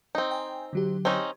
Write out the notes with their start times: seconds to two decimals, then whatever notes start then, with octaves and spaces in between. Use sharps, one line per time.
0.15 C4 D#4
0.31 G5 G#5
0.73 D3 F#3 G4
1.05 C4 C#4 D#4